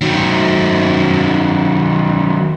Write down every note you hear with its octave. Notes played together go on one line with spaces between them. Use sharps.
D#3 F#3